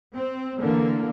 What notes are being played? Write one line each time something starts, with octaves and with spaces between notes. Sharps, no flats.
C4
D3 E3 A#3